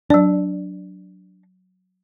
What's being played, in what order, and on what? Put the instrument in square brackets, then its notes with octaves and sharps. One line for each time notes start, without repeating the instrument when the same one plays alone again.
[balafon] F#3 D5 [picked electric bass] D4